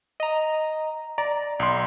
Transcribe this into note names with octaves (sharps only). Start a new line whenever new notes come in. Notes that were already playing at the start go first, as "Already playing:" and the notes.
D#5 A#5
D5 A#5
B1 C6